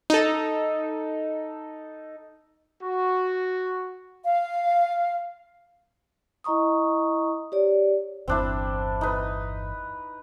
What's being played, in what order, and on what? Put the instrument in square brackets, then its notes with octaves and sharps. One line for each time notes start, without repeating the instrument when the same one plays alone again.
[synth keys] D#4 A4
[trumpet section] F#4
[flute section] F5
[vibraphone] E4 D#5 A#5 C#6 D#6
G4 C#5 D5
[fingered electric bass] G1 E2 [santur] C4 D4 E4
[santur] D#4 B4